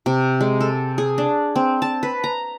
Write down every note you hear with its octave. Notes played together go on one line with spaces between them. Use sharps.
C3
G#3
A4
G#4
D4
C4
A5
B4
A#5